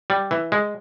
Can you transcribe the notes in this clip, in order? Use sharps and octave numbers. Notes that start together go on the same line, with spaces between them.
G3
E3
G#3